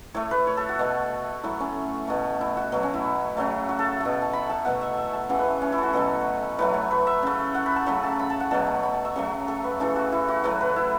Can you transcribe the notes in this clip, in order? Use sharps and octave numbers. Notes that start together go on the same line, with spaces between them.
A2 A3 C#5
B4
C#5
A4
F#4
B2 A3
A2 F#3 A3 E4
C#4
B2 A3
E4
F#4
B2 F#3 A3
C#4
E4
C#3 F#3 A3
F#4
A4
B2 A3
A5
B5
A5
B2 A3 F#5
E5
E5
A5
C#3 E3 A3 F#5
B4
C#5
C#4
E4
F#4 A4
B2 F#3 A3 A4
A2 F#3 A3 B4
C#5
B4
E5
C#3 A3
F#5
B5
A5
C#3 F#3 A3 B5
A5
B5
A5
F#5
B2 F#3 A3 A5
A5
B5
A5
E5
C#3 F#3 A3 C#5
A4
B4
C#3 E3 A3 A4
F#4
E4
F#4
A2 F#3 A3 B4
B4
E4